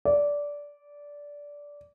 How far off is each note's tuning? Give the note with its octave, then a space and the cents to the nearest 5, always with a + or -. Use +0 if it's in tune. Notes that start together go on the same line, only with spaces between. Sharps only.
D5 -15